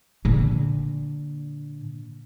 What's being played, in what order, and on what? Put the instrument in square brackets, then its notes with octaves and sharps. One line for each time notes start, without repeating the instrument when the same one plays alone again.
[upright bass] A#2 D3